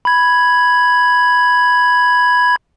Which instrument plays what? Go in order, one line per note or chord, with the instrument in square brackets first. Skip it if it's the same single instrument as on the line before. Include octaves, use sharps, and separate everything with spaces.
[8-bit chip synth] B5 G#6